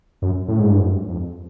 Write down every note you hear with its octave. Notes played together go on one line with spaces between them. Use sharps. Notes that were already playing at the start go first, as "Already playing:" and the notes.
F#2
A2
G#2
G2
F#2
F2